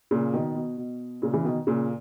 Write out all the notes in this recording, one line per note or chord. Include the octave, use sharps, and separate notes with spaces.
A#2 C#3
B2 D#3
B2
B2
A#2 C#3
C#3 E3
B2 D#3
A#2 C#3